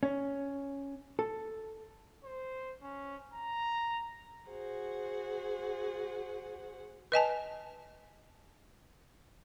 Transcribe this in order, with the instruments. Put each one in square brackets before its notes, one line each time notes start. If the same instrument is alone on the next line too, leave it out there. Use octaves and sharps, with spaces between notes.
[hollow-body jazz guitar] C#4
A4
[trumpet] C5
C#4
A#5
[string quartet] F#4 G#4 C5 F#5
[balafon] B4 D#5 G#5 A5